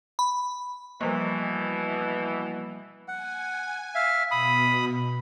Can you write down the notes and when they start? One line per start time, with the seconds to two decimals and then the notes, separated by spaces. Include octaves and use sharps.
0.19 B5
1.01 B2 E3 F3 G3 A#3
3.08 F#5 G#5
3.95 E5 F5
4.31 B2 B5 D#6